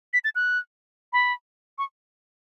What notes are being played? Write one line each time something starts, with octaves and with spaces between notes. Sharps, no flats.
B6
A6
F#6
B5
C#6